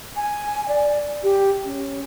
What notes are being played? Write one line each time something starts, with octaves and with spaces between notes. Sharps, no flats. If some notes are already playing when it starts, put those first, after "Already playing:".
G#5
D5
G4
C#4